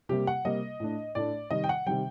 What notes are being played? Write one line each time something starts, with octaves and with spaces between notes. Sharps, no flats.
C3 G3 A#3 G4
F#5
C3 G3 A#3 D#5
A2 A3 D4
A2 A3 D4 D5
C3 D#3 G3 D#5
G5
F#5
C3 D#3 G3 G5